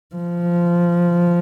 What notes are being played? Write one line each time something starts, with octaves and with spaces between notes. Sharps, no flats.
F3